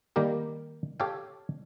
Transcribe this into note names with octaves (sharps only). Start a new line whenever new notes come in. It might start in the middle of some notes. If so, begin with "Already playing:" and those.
D#3 G3 A#3 G4 A#4
G4 A4 C#5 F5 G5